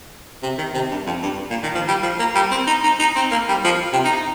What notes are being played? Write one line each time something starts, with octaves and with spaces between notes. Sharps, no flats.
C3
D#3
C3
G2
F2
G2
A#2
D#3
F3
G3
F3
A#3
G3
C4
D#4
D#4
D#4
C4
A#3
G3
F3
C3
D#4
D#4